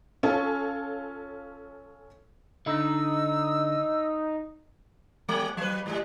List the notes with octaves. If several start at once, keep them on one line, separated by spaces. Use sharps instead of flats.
C#4 F4 A4
D3 D#4 E6
G3
F#3 B4
G#2 G3 G#3